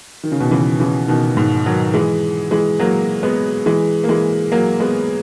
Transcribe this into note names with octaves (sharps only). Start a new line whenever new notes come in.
D#3
C#3
B2 D#3
C#3 E3
C#3 E3
B2 D#3
G#2
D#3 F#3
E3 G#3
E3 G#3
F#3 A#3
G#3 B3
E3 G#3
A#3
E3 G#3
F#3 A#3
G#3 B3